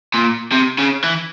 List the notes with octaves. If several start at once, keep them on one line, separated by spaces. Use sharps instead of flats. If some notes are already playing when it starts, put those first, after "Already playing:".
A#2
C3
C#3
E3